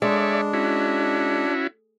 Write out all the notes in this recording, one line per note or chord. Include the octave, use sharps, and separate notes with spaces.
G#3 D4 C#5 D5 E5
C#4 E4 F#4